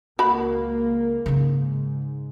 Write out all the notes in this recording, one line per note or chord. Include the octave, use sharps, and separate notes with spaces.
C#2 A#3 F#4 B5
G#2 C#3 D#4